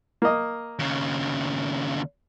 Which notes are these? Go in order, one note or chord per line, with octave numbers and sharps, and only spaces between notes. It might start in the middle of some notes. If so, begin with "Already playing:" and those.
A#3 D#5
D#2 C#3